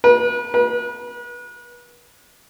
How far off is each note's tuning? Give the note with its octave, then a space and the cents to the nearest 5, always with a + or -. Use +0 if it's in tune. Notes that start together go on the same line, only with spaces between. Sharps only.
B4 -40
B4 -40